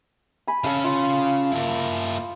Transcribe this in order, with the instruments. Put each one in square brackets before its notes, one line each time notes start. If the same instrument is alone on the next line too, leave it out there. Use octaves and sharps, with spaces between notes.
[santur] G#5 B5
[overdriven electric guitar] C#3 C#4 [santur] A4 F5
[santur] F4
[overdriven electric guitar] A#3 E4